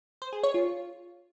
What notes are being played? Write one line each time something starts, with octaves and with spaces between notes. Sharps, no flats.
C5
G#4
C#5
F4